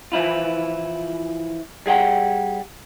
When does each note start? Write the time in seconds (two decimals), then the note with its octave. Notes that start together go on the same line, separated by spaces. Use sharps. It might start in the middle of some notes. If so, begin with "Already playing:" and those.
0.12 E3 F3 E4 F4
1.86 G3 G#4 F#5 G5